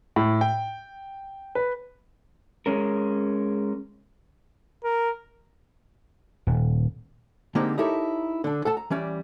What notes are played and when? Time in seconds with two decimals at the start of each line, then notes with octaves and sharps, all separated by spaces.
0.16 A2
0.41 G5
1.55 B4
2.66 G#3 C#4 A#4
4.84 A#4
6.47 D#1
7.55 D3 G#3 A#3 C4 D#4 G4
7.78 D#4 E4 G4 A4 A#4 C#5
8.44 D3 D4
8.65 A4 F#5 A5
8.77 A#5
8.90 E3 G3 C#4 D5